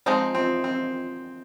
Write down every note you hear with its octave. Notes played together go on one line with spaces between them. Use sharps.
F3 G#3 C4 D#4
C4
C4